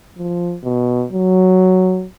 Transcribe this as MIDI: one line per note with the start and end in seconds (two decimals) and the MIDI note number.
0.18 0.57 53
0.64 1.04 47
1.13 2.06 54